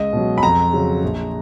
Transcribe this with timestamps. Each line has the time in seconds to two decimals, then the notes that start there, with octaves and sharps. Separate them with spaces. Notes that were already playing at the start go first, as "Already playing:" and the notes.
Already playing: C#2 D#5
0.13 B2 F#3
0.38 B5
0.42 F2 A#5
0.73 C#3 F#3
1.03 A#1